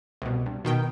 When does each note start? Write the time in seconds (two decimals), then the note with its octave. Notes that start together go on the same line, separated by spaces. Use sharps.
0.22 C2 B2
0.46 G2
0.65 B2 D#3 G5